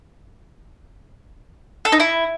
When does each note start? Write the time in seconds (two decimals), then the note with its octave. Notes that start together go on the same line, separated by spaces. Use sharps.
1.85 A4
1.92 D#4
2.00 E4